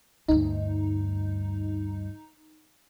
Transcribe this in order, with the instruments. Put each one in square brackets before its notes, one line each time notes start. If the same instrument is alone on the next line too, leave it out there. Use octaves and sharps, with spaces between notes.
[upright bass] D2 G2 [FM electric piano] D#4